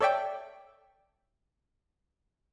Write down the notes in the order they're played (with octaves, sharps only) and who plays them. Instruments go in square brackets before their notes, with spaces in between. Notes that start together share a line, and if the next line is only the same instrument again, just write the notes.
[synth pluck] A4 C#5 D5 E5 G5